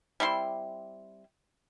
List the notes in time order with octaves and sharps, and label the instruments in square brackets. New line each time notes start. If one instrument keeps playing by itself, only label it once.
[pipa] G3 C4 E4 C6